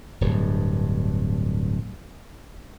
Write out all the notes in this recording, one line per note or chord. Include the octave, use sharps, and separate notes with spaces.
D1 G2